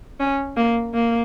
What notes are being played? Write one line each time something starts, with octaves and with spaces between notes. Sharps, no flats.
C#4
A#3
A#3